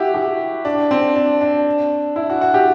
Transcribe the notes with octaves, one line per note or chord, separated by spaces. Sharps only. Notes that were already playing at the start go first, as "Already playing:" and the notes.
Already playing: E4 F#4 G4
G4
D4
C4
D4
D4
E4
F#4
F#4
G4